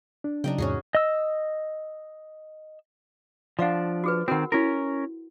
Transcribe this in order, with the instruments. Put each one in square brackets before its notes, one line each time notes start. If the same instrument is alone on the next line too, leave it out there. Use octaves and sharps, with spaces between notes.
[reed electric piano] D4
[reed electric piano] C#3 F#3 [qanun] D4 D#4 G5
[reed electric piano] E2 G#2 C3 [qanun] C#4 F#4 G#4
[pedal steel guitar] D#5 E6
[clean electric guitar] F3 D4 [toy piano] D5 F5 F#5
[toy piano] F#4 G#4 B4
[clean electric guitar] D#3 C4 [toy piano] F#4 A#4 F#5
[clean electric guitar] C#4 A#4 [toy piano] E4 F#4